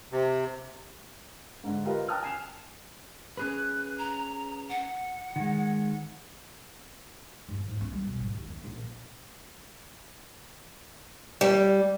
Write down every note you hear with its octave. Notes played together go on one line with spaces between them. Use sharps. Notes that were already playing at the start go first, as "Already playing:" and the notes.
C3
G#2 D3
F4 G4 A#4 B4 D#5 F5
G5 A5 A#5 D#6 F6 F#6
G#5 C7 E7 F7
C#4 G#4 B4 F#6
A#5
F#5
D#3 G#3
G2
G#2
C#4
G3
B2
G#1
D#2
C#3
A#1
G3